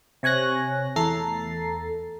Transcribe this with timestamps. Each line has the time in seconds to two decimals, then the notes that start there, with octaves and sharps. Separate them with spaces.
0.23 C3 C#5 G#5 F#6 A#6
0.96 E2 A3 A4 A#5 A6 C7